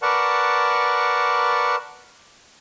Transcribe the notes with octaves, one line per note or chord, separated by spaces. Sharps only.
A#4 B4 D5 F#5 A5 C#6